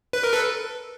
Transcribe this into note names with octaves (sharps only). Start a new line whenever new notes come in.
B4
A#4
A4 B4